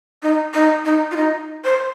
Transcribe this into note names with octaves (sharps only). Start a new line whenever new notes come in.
D#4
D#4
D#4
F4
D#4
C5